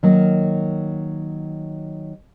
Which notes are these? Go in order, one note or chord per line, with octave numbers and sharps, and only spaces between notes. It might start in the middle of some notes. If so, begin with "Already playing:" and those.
D#3 F#3 A#3